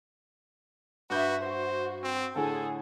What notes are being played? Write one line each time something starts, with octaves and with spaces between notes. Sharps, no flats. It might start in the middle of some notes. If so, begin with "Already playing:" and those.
G2 F#4 B4 E5 D6 G6
F#4 C5
C4
A2 D3 G#4 A4